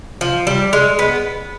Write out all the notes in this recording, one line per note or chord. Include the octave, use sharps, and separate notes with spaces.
F3
G3
G#3
B3